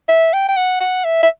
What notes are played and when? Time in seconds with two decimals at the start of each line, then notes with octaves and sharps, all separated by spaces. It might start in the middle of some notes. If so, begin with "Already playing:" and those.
0.09 E5
0.33 G5
0.49 G5
0.57 F#5
0.80 F#5
1.04 E5
1.23 E5